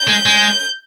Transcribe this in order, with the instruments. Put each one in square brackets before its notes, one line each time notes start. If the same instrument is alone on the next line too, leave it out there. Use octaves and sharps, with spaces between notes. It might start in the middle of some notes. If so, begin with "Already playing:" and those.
Already playing: [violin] G6
[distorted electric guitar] G#3
G#3